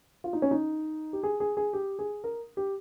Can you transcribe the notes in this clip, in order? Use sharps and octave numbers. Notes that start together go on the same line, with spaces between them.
F4
D#4
C#4
D#4
G4
G#4
G#4
G#4
G4
G#4
A#4
G4